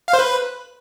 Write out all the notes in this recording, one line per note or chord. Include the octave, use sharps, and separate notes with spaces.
F5
C5
B4